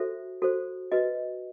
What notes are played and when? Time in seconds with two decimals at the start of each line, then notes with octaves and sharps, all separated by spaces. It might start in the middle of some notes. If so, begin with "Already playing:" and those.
Already playing: F#4 A4 C5 E5
0.42 F#4 A4 C5
0.92 F#4 B4 D#5